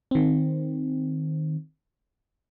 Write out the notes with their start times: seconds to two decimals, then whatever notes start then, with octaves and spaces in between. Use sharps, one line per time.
0.11 D#3 C4